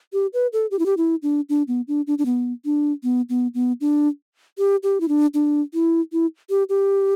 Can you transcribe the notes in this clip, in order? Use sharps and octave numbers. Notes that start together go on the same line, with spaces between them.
G4
B4
A4
G4
E4
G4
E4
D4
D4
B3
D4
D4
D4
B3
D4
B3
B3
B3
D4
G4
G4
E4
D4
D4
E4
E4
G4
G4